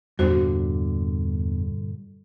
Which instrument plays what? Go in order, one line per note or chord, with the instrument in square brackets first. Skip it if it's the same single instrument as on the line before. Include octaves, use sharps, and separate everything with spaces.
[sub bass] E2 [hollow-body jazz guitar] G2 A#2 D3 [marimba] F#4 C5